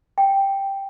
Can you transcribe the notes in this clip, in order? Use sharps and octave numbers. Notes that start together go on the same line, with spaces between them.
G5